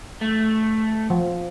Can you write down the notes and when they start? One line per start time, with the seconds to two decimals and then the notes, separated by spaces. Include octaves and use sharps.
0.21 A3
1.10 F3